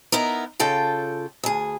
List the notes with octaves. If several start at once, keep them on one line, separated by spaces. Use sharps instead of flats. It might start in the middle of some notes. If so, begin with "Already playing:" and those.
B3 D#4 E4 A#4
C#3 F4 A4 G5
D2 G#4